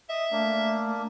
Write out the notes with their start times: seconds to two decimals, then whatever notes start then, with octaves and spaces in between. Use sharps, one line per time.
0.09 D#5 E5
0.32 A3 A#3 D4